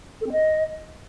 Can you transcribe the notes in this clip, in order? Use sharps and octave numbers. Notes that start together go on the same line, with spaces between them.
A4
C4
D#5